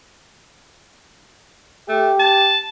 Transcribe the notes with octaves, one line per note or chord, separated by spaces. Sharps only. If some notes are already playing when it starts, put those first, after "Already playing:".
A3 G4
A5